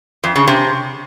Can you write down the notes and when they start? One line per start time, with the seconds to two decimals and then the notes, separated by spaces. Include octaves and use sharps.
0.24 F2
0.36 C#3
0.48 C3